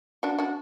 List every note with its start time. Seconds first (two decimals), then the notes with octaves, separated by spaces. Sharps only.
0.23 D4 F#4
0.38 D4 F#4